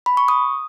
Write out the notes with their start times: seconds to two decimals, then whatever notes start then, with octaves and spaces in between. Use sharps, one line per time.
0.06 B5
0.17 C#6
0.28 D#6